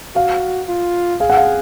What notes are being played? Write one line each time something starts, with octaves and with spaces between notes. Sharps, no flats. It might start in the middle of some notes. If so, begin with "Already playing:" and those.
F#4 F5
F4
G#4 F5
F#5
F5